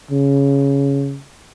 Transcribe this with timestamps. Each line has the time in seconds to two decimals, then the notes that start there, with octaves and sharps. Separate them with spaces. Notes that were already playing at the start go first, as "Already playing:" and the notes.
0.11 C#3